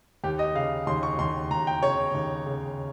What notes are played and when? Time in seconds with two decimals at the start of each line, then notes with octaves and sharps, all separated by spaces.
0.24 D#2 G4
0.39 D#5
0.55 C#3 F5
0.87 D#2 C6
1.03 C#6
1.19 D#2 C6
1.51 D#2 A#5
1.67 G5
1.83 C#3 C#5
2.15 D#2
2.46 C#3